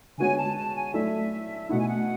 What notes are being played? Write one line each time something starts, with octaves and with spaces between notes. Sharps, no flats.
D3 G#3 B3 F#4 C#5 G#5
A5
A5
G#5
F#3 A3 E4 A4 D5 E5
B2 A3 E4 F#5
G#5
F#5